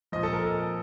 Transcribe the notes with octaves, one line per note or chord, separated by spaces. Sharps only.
A#2 F3 D#5
A4
A#4
A4